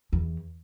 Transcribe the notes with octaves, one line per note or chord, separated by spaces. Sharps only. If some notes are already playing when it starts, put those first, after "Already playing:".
E2